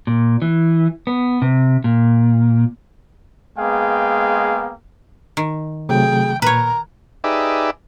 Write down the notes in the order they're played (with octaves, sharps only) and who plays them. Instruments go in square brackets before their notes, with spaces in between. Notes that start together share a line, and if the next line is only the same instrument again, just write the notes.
[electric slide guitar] A#2
E3
B3
C3
A#2
[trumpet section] G#3 A#3 B3 G#4 F5 G5
[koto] D#3
[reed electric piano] C3 F#3 A3 [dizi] G#4 [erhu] G5
[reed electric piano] A#2 [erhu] A#4 [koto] B4 C#5 [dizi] A#5
[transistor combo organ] D#4 G4 G#4 B4 D5 E5